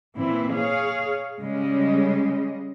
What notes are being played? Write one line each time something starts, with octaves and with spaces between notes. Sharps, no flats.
A#2 E3 C4 E4
G#4 C#5 F5
C#3 G3 G#3 D#5